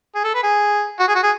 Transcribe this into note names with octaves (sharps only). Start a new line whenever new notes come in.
G#4
A4
B4
G#4
F#4
G#4
F#4
G#4